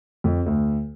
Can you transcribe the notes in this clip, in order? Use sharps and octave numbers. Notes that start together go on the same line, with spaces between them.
F2
D2